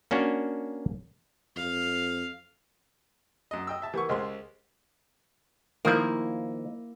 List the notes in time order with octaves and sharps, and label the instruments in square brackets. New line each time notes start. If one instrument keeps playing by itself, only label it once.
[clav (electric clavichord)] A#3 C#4 D4 F#4
[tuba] F2 [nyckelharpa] F5
[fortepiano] F#2 D#5
D#5 G5 E6
E5 A5
[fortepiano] E3 C#6 [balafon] G4 A#4 F#5
[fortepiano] C#2 G#3 C6 [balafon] G#4 C5 D#5
[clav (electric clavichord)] D#3 F3 [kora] A#3 E4